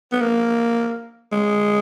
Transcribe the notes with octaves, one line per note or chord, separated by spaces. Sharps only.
B3
A#3
G#3